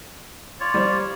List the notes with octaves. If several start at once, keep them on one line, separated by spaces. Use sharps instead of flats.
F4 C#5 D5
G3 C5